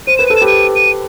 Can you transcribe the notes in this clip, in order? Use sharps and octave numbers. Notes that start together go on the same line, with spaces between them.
C5 D#7
B4 E7
A4 D#7
E7
G4 B4
D#7
D#7